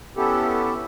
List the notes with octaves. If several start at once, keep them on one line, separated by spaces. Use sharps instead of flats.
B3 C#4 E4 G4 A4